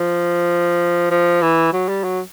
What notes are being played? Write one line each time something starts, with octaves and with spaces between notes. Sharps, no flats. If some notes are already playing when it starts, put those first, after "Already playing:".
Already playing: F3
F3
E3
F#3
G3
F#3